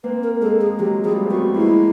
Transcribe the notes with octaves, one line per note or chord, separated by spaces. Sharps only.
A#3 C4 B4
A#4
G#3 A#3 A4
G#4
F#3 G#3 G4
F3 G3 G#4
C4
A3 B3 F#4
G#3 A#3 E4